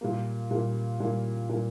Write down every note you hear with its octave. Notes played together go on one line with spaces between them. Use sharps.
A#2 G3 A#3
A#2 G3 A#3
A#2 G3 A#3
A#2 G3 A#3